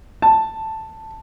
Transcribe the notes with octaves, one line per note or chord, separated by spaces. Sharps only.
A5